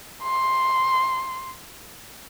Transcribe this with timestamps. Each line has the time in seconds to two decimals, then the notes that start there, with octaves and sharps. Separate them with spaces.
0.23 C6